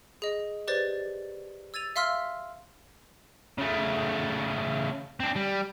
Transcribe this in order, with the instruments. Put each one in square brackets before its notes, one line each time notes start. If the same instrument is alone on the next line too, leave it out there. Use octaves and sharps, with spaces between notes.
[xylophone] G#4 D#5
G4 B4 C5 D5 A6
E6 G#6 A6 D#7 F7
E5 F5 C6 E6 F6 B6
[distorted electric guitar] C#3 A3
C4 D4
G3